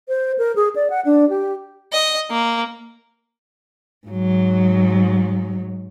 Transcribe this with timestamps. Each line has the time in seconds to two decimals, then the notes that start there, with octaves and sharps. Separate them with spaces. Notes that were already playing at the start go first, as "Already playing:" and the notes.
0.09 C5
0.38 A#4
0.56 G#4
0.76 D5
0.90 F#5
1.05 D4
1.29 G4
1.92 D#5
2.31 A#3
4.07 G#2 F#3